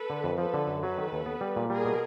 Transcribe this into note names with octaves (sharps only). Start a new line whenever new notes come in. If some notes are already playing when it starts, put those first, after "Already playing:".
Already playing: A4 B4
D3
F2
F3 A4 B4
D3
F#2
F#3 A4 B4
D#3
D#2
B3
G3
A#2
G3 G#4 A#4
B2